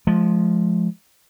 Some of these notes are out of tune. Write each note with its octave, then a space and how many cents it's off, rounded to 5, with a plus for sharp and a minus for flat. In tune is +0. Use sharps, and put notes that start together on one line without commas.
F3 +0 G#3 +30